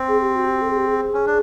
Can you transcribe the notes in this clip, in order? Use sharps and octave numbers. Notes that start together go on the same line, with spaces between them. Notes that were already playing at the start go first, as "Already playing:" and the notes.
Already playing: C4
G#4
G4
F#4
G4
A4
G#4
G4
G#4
C#4
D4